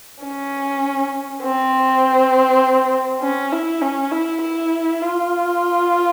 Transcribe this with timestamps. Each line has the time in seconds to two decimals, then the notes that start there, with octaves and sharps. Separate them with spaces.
0.24 C#4
1.43 C4
3.22 C#4
3.52 E4
3.82 C#4
4.12 E4
4.42 E4
5.02 F4